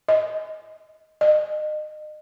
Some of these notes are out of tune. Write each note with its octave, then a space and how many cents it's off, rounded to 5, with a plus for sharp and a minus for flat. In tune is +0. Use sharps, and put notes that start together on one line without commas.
D#5 +15
D#5 -30